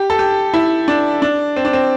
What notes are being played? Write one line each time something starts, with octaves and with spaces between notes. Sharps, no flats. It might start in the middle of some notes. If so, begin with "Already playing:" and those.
Already playing: G4
A4
G4
E4
D4
D4
C4
D4
C4